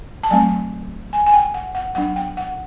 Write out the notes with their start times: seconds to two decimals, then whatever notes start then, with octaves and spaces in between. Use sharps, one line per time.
0.23 A5
0.30 F#3 A3 C4 G#5
1.13 G#5
1.26 G#5
1.33 G5
1.54 F#5
1.75 F#5
1.95 F#3 B3 D4 F#5
2.16 G5
2.37 F#5